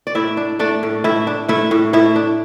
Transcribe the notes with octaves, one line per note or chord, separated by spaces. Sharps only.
D5
A2 E4 E5
D4
A3 D4 D5
A2
A2 E4 E5
D4
A3 E4 E5
A2
A2 E4 E5
D4